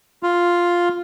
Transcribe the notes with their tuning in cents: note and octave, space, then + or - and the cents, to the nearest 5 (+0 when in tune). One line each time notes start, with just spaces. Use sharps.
F4 +0